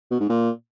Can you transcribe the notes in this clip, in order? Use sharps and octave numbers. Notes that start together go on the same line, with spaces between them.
B2
G#2
A#2